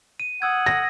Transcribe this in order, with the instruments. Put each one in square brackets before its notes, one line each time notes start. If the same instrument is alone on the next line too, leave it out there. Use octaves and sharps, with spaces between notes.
[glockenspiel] D#7
[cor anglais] F#5 [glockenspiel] D#6 E6 G#6
[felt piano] A#6